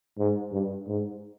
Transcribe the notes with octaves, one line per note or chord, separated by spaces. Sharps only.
G#2
G2
G#2